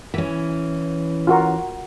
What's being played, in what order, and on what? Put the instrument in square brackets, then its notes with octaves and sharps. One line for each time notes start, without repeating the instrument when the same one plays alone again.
[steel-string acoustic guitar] E3 C#4
[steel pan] F4 F#4 A#4